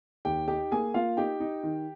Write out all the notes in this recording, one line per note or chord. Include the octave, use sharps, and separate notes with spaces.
D#2 G4 G5
D#4 G4 G5
A#3 G#4 G#5
A#3 F4 F5
D#4 G4 G5
D#4
D#3